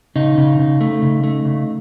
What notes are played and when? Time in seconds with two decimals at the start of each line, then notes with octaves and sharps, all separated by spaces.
0.16 C#3 D#4
0.38 C#3
0.59 C#3
0.81 A3
1.02 C#3
1.24 A3
1.45 C#3